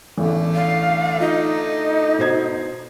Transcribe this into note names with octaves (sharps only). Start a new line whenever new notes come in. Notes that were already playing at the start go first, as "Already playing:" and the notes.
A1 E2 D3 A3
F5
D#4 F4
B2 C5 G#6